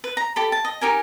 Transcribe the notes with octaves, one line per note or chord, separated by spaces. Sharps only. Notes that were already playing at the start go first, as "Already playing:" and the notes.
B4
A#5
G4 A4 B5
A5
D#5
D#4 G4 A#4 G#5